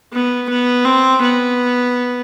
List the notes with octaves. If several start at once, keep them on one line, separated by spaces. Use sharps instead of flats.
B3
B3
C4
B3